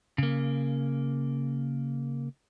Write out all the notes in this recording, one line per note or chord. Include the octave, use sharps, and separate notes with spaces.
C#3 A#3